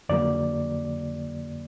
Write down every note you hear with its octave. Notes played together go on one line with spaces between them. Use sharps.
F2 D3 F#3 A#3 D5